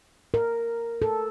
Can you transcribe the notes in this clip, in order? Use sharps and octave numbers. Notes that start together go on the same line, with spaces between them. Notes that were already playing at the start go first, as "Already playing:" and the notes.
A#4
A4